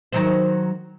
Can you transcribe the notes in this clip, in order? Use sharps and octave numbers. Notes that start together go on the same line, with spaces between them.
D#3 F#3 C5